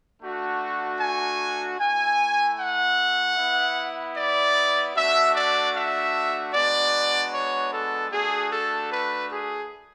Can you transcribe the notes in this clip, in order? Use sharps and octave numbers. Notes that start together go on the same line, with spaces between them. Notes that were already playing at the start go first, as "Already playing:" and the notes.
A3 D4 F#4
G#5
A3 E4 G#5
F#5
B3 E4
D5
A3 D4 F#4 E5
D5
E5
G#3 B3 D4 F#4 D5
C#5
A4
A3 D4 F#4 G#4
A4
B4
G#4